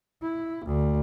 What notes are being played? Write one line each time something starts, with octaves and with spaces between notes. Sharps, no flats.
E4
D2